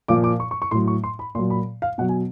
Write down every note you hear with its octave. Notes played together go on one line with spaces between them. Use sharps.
A#2 F3 D6
D6
C#6
C#6
C#6
A2 F#3 C6
C#6
C6
B5
A#2 F#3 C6
B5
F5
B2 F#3 F#5
G#5